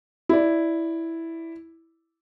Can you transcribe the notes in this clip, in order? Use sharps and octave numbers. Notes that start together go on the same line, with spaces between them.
E4 D5